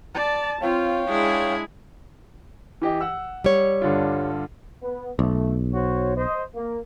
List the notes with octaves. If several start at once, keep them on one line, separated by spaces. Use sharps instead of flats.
D5 A5
C4 F4 C#5 F5 G5
G#3 D4 E4 G#4
E3 G4 D#5
F#5 E6
G3 C#5
G2 D3 F4
B3
B1 A3
F#4 C5 C#5
C5 D#5
A#3